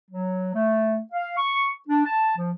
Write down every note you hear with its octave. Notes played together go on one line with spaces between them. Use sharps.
F#3
A3
F5
C#6
D4
A5
F3